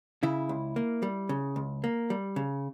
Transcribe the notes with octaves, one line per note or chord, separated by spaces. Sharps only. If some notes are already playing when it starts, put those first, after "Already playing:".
C#3 E4
C#2
A#3
G3
C#3
C#2
A#3
G3
C#3